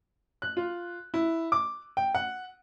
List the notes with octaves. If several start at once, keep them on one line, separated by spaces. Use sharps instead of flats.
F#6
F4
E4
D6
G5
F#5